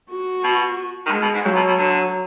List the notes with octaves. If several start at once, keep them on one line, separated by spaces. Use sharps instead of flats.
F#4
B2
D#3
D3 G#3
B2
G#2
F2 F#3
B2
B2
D3